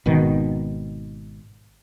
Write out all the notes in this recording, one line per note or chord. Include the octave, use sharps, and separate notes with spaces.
G#1 B2 D#3